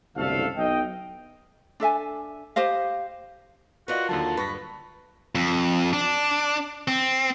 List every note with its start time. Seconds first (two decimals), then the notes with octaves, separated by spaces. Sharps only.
0.16 F#1 C2 D3 A3 A4 F5
0.56 B1 D#5 G5
1.80 D4 A4 E5 G#5
2.56 G4 C5 D#5 F5
3.88 F4 F#4 A#4 B4 D5 D#5
4.09 D#2 D3 F#3 A5
4.37 G2 B4 C#6 A#6
5.35 F2
5.93 D4
6.88 C4